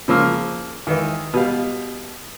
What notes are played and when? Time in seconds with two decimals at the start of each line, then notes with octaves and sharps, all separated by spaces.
0.08 C#3 F3 A#3 E6
0.87 D#3 E3
1.34 B2 G3 F5